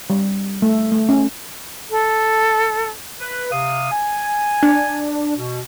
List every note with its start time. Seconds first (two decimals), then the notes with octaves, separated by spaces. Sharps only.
0.10 G3
0.62 A3
0.92 A3
1.09 C#4
1.90 A4
3.20 B4
3.52 C3 F5 D#6
3.92 G#5
4.63 D4
5.35 B2